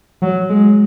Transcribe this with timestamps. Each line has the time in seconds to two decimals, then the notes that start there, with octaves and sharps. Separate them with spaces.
0.22 F#3
0.50 G#3